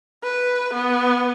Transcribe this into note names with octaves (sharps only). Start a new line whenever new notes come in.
B4
B3